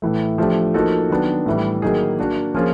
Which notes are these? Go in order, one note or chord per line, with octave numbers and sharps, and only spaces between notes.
A2 E3 A3
F3 A3 D4 G4
F3 A#3 D#4 F#4 A4
D#3 F#3 B3 D4
A2 E3 G3
D#3 F#3 A#3 D#4 G#4
A#3 D4 F#4
F3 A#3 C#4 F4 G#4